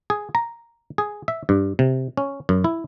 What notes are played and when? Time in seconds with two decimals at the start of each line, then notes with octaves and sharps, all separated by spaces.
0.10 G#4
0.35 A#5
0.98 G#4
1.28 E5
1.49 G2
1.79 C3
2.17 C#4
2.49 F#2
2.64 E4